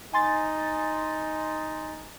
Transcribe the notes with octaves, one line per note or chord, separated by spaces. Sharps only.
D#4 G#5 C6 A6